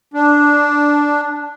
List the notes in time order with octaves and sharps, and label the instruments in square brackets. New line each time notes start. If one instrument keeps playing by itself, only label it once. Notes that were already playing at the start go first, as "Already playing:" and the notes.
[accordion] D4